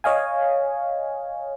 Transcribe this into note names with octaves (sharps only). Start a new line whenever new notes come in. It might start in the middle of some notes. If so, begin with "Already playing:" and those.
C#5 D#5 F5 G#5